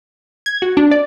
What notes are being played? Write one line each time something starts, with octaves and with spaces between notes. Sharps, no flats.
G#6
F#4
D4
D5